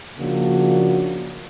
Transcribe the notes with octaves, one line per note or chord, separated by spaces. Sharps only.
C#3 F3 A#3 D4 F#4